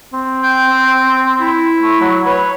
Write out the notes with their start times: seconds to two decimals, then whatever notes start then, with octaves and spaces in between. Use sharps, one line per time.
0.13 C4
0.43 G5
1.41 E4
1.82 A3
2.01 F#3
2.26 B4 C#5